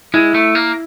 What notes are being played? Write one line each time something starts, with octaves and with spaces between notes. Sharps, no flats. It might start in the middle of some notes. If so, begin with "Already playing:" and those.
G#3 E4
A3
A#3